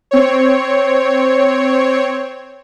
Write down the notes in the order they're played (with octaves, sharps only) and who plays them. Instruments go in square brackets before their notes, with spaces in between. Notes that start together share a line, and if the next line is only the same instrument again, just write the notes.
[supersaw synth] C4 C#5